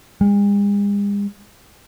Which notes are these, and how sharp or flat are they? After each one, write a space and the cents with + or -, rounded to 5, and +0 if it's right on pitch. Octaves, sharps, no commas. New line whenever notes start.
G#3 -45